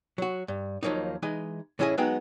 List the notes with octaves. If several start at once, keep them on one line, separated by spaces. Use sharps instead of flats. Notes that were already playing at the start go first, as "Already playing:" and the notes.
F#3 F#4
G2
D#2 F3 F#3 A#3 D#4
E3 G#3 D#4 D#5
A2 E3 C#4 E4 G#4 D#5
F#3 G#3 B3 D#4 F#4 G5